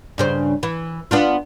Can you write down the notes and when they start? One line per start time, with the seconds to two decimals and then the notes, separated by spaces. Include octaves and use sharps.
0.18 G2 C#3 C5
0.63 E3
1.11 B3 D4 F4